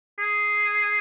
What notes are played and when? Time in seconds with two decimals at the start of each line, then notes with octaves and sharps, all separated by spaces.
0.18 G#4